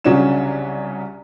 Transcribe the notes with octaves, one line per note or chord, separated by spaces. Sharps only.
C2 C#3 F#3 C#4 D4 E7